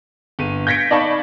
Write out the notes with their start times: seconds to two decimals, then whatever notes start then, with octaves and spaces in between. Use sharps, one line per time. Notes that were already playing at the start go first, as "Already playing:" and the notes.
0.39 G1 D#7
0.67 G6 G#6 A#6 B6 C#7 D7
0.91 D#4 D5 F5 A5 B5 C#6